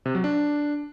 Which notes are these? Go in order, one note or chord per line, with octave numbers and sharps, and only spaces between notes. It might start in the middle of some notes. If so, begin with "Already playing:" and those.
C3
F#3
D4